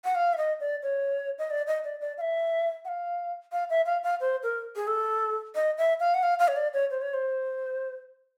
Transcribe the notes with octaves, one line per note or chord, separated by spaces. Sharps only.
F#5
F5
E5
D#5
D5
C#5
D#5
D5
D#5
D5
D5
F5
E5
F#5
F5
F5
E5
F5
F5
C5
A#4
G#4
A4
D#5
E5
F5
F#5
F5
F5
C#5
D5
C#5
C5
C#5
C5